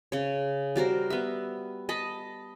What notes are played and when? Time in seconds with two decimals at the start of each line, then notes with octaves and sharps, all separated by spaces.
0.12 C#3 C#5
0.76 G3 F#4 A#4 C5
1.10 B3 E5
1.89 D#5 A5 B5